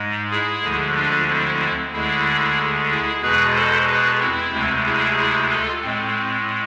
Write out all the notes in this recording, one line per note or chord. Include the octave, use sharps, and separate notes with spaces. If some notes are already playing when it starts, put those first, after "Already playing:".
Already playing: G#2 G#3
E4 G#4
D2 D3 F3 G#3
D4 F4
C4 E4
D2 D3 G#3 E4 G#4
E4 G#4
E2 B2 G#3 G#4 B4
A4 C5
G#4 B4
C4 E4
D2 C3 G#3
E4 G#4
E4 G#4
F4 A4
A2 G#3 C4